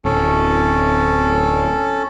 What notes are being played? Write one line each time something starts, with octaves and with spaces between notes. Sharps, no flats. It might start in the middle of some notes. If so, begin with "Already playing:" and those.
D1 C#4 A4